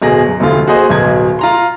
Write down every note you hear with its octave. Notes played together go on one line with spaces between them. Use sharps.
D1 B2 G#4 A#6
F#2
F1 D2 D3 F4
A#3 F#4 G#4 C5 D#5
D1 B1 B2 G#6
F4 A#5 C6